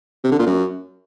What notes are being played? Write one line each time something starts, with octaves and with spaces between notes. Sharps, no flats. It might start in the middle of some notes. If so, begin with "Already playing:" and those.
C3
D3
A#2
F#2